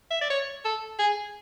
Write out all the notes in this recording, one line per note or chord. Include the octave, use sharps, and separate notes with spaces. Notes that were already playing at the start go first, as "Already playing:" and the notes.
E5
D5
C#5
A4
G#4